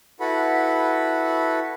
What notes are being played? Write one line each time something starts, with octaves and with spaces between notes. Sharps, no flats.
E4 F#4 A4 B4 F#5 B5